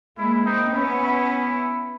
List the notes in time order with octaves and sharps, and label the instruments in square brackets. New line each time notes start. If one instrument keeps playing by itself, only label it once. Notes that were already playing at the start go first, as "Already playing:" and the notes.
[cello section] G#3 A#3 [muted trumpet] E4
[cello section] A#3 C4 [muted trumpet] D#4
[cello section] B3 C#4 [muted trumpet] E4
[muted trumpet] E4